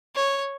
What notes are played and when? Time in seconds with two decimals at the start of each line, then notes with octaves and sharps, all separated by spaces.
0.15 C#5